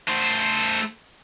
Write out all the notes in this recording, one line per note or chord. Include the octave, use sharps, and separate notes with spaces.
A3 C5